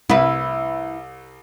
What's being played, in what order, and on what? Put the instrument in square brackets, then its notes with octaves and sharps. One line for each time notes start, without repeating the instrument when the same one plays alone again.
[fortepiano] C2 [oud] E4 B4